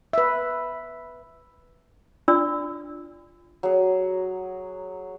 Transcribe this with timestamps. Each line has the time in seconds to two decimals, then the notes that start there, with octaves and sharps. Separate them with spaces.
0.13 B4 E5
2.28 D4 F4 D5 E6
3.63 F#3 G#4